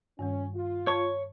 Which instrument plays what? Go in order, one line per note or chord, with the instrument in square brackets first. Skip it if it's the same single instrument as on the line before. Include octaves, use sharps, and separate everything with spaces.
[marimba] G2 D#3 G3 [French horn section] C#4
[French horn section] F4
[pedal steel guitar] C#5 C#6 [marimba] A5 G#6